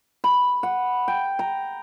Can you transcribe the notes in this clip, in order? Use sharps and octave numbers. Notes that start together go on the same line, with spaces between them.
B5
F#5
G5
A#5